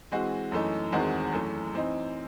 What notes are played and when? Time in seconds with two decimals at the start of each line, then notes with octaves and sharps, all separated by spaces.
0.12 E3 G#3 C4 F#4
0.52 F#2 E3 A3 D#4
0.92 E2 D#3 G#3 C4 F#4
1.32 F#2 E3 A3
1.73 E3 C4 D#4